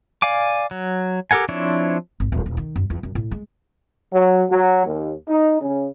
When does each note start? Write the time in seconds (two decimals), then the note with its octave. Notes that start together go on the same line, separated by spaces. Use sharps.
0.22 D5 F5 G#5 D6
0.71 F#3
1.31 G4 A4 A#4 F#5 G#5
1.49 F3 C4 D4 E4 C#5
2.20 G#1
2.32 D1
2.46 D#1
2.57 D#3
2.76 F#2
2.90 E2
3.03 F#2
3.15 A2
3.31 G#3
4.13 F#3
4.50 F#3
4.87 D#2
5.28 D#4
5.61 C#3